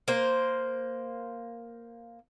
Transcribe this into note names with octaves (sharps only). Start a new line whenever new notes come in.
A#3 C5